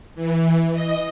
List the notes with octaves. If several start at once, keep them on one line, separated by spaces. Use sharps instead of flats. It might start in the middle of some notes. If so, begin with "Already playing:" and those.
E3
D#5